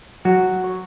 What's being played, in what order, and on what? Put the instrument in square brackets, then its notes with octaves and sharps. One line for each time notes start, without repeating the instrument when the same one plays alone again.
[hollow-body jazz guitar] F#3 [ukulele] F#4
[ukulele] C#5